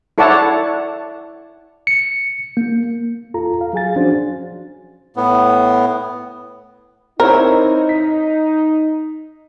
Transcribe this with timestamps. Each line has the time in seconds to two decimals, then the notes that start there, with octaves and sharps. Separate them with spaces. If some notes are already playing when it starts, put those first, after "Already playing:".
0.18 E4 A4 C#5 D5 F#5 A5
1.87 C#7
2.57 A#3
3.34 E2 F4 A4 A#5
3.61 F5
3.73 F#3 G#4 F5 G#5 A6
3.95 F3 C#4 D4 F#4 C5
5.16 A2 B3
7.20 C4 D#4 E4 A#4 C#5
7.89 B6